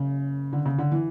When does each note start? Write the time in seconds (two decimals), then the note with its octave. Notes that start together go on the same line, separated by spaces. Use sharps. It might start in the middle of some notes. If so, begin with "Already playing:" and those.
Already playing: F#1 C#3
0.53 D3
0.66 C#3
0.78 D3
0.92 E3